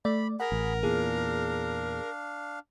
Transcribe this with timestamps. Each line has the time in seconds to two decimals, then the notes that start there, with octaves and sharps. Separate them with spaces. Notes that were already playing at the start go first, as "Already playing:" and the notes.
0.05 A3 D5 B5
0.40 G#4 A#4 F#5 B5
0.52 A1
0.83 E2 A#2 D4 G#4 F5